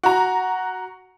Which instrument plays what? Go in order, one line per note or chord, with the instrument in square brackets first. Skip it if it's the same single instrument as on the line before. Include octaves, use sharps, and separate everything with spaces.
[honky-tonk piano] F#4 A#5